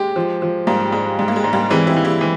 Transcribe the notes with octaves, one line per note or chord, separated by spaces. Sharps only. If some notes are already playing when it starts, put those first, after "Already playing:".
Already playing: G#3 G4
F3
F3
G#2 G3 A#3
G#2 G#3
G#2 G3
A#3
G#3
G#2
G3 A#3
E3 G#3 C4
C4 E4
E3
E4 G4
E3